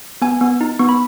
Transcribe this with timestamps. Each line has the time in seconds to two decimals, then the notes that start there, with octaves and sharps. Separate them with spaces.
0.22 B3 G#5
0.41 B3
0.61 D#4
0.79 B3 C#6
0.89 B5